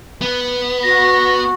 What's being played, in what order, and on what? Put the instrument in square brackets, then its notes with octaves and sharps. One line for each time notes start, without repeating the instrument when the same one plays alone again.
[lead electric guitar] B3
[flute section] F#4 [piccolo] A#6